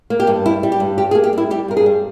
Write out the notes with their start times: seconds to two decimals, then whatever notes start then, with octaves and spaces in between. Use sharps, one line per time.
0.10 A#3
0.20 G4
0.27 G2
0.46 G3 E4
0.63 G3
0.72 G4
0.80 G2
0.98 G3 G4
1.11 G#4
1.15 A#3
1.24 G4
1.33 G3 E4
1.51 G3 G4
1.68 G2 A#4
1.77 G#4
1.86 G3